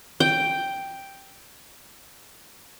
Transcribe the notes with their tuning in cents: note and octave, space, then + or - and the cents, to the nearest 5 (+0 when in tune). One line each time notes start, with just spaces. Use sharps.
G5 +0